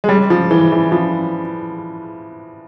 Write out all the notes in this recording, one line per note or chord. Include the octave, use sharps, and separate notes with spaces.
G#3
G3
F3
E3
E3
F3